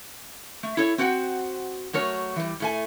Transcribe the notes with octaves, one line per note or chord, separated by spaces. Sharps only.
A3
E4 A4 C#5
C4 F#4 C5 F#5 G5
F#3 A3 A#4 C#5
E3 G3
A2 A3 G#5